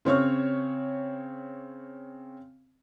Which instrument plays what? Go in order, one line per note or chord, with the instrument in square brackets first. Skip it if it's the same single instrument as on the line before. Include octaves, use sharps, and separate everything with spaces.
[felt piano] C#3 C4 C#5 C#6 F6